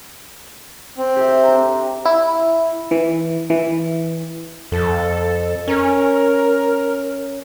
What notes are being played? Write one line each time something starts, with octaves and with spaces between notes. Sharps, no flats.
C4
G4 A4 E5
D4 A#5
E4
E3
E3
F2 A4
C#4 A#4